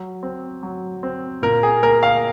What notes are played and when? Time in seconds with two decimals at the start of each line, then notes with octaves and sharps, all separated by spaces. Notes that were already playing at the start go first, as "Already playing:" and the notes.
Already playing: F#3
0.23 C4
0.63 F#3
1.03 C4
1.42 A#2 A#4
1.63 G#4
1.83 A#3 A#4
2.03 F5